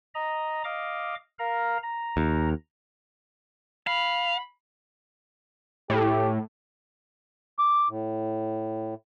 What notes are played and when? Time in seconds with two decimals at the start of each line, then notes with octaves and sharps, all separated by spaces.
0.15 D#5 A#5
0.64 D#5 F5 D6
1.39 A#4 F5 A#5
1.83 A#5
2.17 D#2
3.87 F5 B5
5.90 A2 G4
7.59 D6
7.89 A2